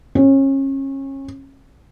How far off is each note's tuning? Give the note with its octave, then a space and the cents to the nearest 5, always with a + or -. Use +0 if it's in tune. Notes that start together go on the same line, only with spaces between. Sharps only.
C#4 -30